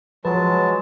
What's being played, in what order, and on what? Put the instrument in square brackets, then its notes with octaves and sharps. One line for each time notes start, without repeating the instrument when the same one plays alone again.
[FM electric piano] F3 B4 [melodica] F#3 G#3 A5